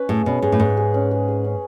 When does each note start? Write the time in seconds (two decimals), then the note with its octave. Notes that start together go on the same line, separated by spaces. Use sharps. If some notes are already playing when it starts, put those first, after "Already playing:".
Already playing: C#4 B4
0.09 A2 G#4
0.26 B2 C#4
0.42 G#2 G#4
0.52 A2
0.60 G#2 B4
0.77 G#4
0.94 C#4
1.11 G#4
1.28 G#4
1.44 C#4